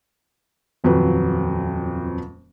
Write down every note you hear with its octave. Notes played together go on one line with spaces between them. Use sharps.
D#1 F2 F#3 B4